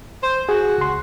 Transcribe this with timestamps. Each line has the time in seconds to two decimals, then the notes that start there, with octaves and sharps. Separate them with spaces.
0.22 C5
0.49 F#4 G#4
0.78 C#2 C6